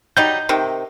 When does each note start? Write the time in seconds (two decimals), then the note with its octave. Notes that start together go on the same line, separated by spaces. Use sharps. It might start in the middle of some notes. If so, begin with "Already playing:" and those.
0.17 F#3 G3 D#4 G6
0.49 C3 D#3